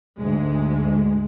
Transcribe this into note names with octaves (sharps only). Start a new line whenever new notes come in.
D2 G#2 G#3